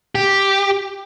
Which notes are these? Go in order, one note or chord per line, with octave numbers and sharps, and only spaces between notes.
G4